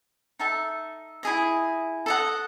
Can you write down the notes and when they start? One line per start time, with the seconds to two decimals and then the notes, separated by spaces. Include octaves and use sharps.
0.39 D#4 A4 E5 A5
1.23 E4 G#4 D#5
2.06 A4 D#5 F#5